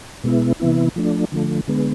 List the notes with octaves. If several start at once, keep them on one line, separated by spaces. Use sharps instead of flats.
B2 G#3 B3 E4
C3 E3 B3 E4
F3 A3 D4
D3 F3 A3
D3 G#3 B3